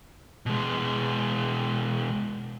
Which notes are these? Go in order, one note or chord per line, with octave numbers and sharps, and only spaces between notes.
B2 G#3